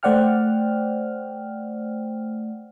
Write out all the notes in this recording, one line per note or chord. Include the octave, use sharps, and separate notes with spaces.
A3 C5 D5 F#5 G5 F6